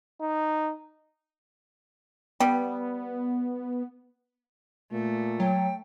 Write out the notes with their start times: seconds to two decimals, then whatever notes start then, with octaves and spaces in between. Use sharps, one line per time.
0.22 D#4
2.40 G3 B3
4.92 A#2 A3
5.40 F#3 G5